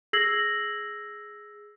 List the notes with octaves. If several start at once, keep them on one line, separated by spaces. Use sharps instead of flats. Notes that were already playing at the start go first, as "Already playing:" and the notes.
G#4 E6 G#6 A#6 C7 F#7